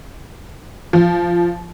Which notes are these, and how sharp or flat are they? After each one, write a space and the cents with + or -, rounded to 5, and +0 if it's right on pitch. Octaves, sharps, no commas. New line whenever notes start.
F3 -15